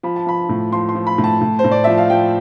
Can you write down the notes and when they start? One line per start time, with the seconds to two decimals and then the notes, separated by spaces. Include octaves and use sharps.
0.03 F3 B5
0.16 A5
0.26 F3 B5
0.49 A2
0.72 F3 C6
0.89 C6
0.95 F3
1.07 B5
1.18 A2
1.24 A5
1.41 A2
1.59 C5
1.64 A2
1.71 D5
1.84 F3 E5
1.97 F5
2.10 F3 G5